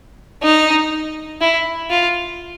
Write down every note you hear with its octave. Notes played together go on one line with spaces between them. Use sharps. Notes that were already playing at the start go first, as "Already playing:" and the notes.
D#4
E4
F4